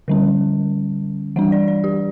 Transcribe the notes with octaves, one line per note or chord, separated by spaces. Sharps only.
D3 G3 C#4
E3 G3 D4 F#5
D5
D5
G4